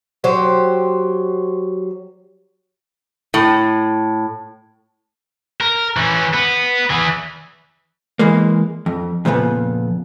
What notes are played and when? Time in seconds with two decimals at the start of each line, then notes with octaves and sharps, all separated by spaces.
0.24 F#3 G4 C5
3.34 A2
5.61 A#4
5.97 E3 C#4
6.34 B3
6.90 E3 G#4
8.19 E3 G#3 A#3
8.86 F2
9.25 F2 A#2 C#3 F3 B3